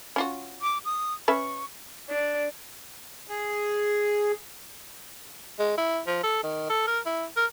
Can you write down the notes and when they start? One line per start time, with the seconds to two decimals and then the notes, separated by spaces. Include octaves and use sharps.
0.16 C#4 F4 F#4
0.62 D6
0.85 D#6
1.28 C#4 B4 E5 C#6
2.10 D4
3.27 G#4
5.59 G#3
5.77 E4
6.06 F3
6.23 A4
6.44 D#3
6.70 A4
6.87 A#4
7.06 E4
7.37 A#4